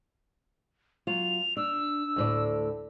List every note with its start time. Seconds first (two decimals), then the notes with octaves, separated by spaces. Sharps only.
1.07 F#3 F4 F7
1.57 D4 E6
2.16 D2 A2 D5